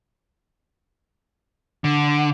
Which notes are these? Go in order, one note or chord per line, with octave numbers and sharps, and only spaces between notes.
D3